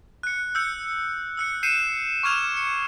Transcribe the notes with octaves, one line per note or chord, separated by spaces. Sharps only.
F#6 C#7
E6 G6 C#7
E6 F#6 C#7
G6 C7 C#7 D#7 E7
C#6 D6 F6 G#6 E7 F7
C#7